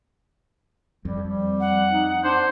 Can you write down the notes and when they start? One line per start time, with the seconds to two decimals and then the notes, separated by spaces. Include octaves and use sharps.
1.05 F2 G3
1.29 G3
1.60 F#5
1.90 D#4
2.24 D4 C5